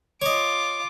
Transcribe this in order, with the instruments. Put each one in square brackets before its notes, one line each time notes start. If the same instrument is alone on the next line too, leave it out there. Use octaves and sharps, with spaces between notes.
[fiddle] F4 D6 [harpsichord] C#5 D#5